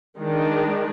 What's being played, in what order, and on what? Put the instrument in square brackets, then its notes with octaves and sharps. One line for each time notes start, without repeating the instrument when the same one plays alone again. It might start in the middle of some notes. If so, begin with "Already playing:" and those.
[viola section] D#3 G#3 D4